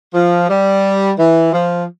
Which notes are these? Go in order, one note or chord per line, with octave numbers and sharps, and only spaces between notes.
F3
G3
E3
F3